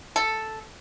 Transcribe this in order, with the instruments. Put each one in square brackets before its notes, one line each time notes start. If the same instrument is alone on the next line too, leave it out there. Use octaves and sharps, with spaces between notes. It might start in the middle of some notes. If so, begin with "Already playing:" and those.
[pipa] A4